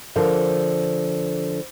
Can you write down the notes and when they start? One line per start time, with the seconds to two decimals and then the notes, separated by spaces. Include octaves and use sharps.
0.16 D3 F3 A#4 F5